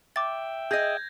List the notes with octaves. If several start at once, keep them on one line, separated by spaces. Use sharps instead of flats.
E5 G5 D6 A6
G#4 D#5 G6 G#6 A#6